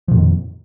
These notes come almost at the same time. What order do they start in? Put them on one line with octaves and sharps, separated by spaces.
F3 A#2 F2 D#3